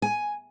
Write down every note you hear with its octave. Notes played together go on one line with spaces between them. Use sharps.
G#5